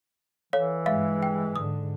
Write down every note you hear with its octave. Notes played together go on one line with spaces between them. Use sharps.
E3 A4 C#5 F5
G2 G#3 E5 F5
G5
G#2 D3 D#6